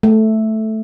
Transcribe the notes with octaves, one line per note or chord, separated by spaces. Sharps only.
A3